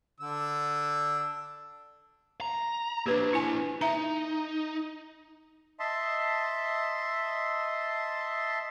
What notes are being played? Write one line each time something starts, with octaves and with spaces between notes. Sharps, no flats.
D3 D4 E6
A#5
A#3 D4 G4 B4
E4 G#5
D#4 E5 A#5
D#5 E5 A5 C6